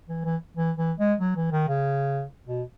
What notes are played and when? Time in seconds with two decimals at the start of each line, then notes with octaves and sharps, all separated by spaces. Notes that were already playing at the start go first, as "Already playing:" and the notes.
0.09 E3
0.25 E3
0.57 E3
0.78 E3
0.99 G#3
1.21 F#3
1.36 E3
1.52 D#3
1.68 C#3
2.48 B2